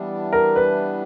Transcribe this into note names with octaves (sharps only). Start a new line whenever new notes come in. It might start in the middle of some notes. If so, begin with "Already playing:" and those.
Already playing: E3 G3 B3 D4
A#4
B4